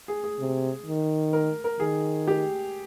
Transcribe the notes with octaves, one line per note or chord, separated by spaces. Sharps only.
G#4
G#4
C3
D#3
A#4
A#4
D#3 G#4
G4